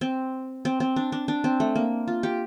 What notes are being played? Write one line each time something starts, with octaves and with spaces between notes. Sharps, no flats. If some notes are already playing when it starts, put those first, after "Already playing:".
C4
C4
C4
D4
D4
D4
C4
A3
A#3
F4
G4